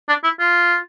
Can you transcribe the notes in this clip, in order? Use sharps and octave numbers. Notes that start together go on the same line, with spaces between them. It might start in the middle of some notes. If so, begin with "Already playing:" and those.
D4
E4
F4